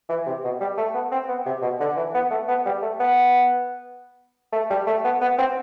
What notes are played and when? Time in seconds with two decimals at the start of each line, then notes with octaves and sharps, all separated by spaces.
0.09 E3
0.27 C3
0.44 B2
0.61 G3
0.78 A3
0.95 B3
1.12 C4
1.28 B3
1.46 C3
1.62 B2
1.80 D3
1.97 E3
2.14 B3
2.31 A3
2.49 B3
2.66 G3
2.82 A3
3.00 B3
4.53 A3
4.71 G3
4.87 A3
5.05 B3
5.22 B3
5.39 C4